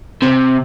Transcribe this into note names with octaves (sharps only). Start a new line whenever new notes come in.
C3